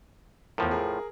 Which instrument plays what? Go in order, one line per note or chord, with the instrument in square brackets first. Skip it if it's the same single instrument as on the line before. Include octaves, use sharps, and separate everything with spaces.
[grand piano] E2 A#4 [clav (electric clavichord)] A2 F3
[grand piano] G#4 A#4